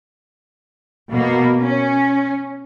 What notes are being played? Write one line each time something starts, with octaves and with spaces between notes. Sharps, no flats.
B2 A#3
C#4